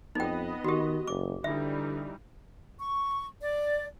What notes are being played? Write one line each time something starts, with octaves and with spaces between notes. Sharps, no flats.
F2 B3 D#4 D#5 G5
D#3 F#4 G4
F#1 D6
D3 E3 G3 D#4 E5
C#6
D5